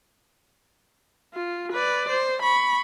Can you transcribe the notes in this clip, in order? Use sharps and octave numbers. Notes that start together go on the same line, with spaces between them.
F4
B4 D5
C5
B5 C#6